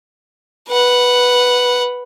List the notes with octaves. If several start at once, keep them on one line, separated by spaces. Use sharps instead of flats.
B4 F#5